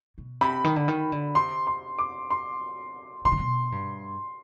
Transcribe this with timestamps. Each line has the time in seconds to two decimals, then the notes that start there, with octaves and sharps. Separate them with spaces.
0.18 B2
0.41 C3 B5
0.64 D#3
0.76 D3
0.88 D#3
1.12 D3
1.35 C3 C6
1.67 C6
1.99 D6
2.30 C6
3.25 B2 C6
3.32 C3
3.39 B2
3.72 G2